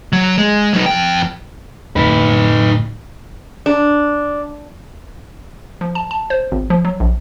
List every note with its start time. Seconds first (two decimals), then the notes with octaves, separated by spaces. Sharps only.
0.13 F#3
0.38 G#3
0.73 F#3 D#4
0.86 F2 G5
1.96 D1 F2 D#4 B4
3.66 D4
5.81 F3
5.95 A5
6.11 A5
6.30 C5
6.52 G#1
6.70 F3
6.85 F#3
7.00 A#1